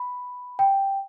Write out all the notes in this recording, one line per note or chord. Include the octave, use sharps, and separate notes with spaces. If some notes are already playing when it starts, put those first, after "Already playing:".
Already playing: B5
G5